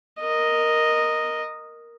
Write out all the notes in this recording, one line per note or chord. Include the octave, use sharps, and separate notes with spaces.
A#4 D#5